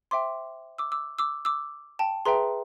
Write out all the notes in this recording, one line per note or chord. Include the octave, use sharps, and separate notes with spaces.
C5 E5 G5 C6 D6
D6 E6
D6 E6
D6 E6
D6 E6
G5 A5
G#4 B4 E5 G5 A#5 C6